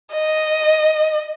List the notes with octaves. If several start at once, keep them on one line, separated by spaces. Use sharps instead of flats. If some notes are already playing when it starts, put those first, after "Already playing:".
D#5